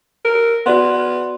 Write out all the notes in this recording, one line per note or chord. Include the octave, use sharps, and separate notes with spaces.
A#4
B3 F#4 D5 C6